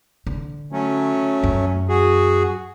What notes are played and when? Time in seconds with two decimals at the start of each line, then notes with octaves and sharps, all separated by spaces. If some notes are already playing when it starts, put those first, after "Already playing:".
0.26 D3
0.72 F#3 A3 C#4
1.43 F#2
1.88 F#4 G#4